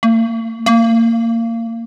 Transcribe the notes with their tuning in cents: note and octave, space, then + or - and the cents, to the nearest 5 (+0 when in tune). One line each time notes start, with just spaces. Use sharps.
A#3 -45
A#3 -25